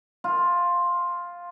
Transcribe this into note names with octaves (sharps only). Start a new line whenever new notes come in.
F4